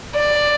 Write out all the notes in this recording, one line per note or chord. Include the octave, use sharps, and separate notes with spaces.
D5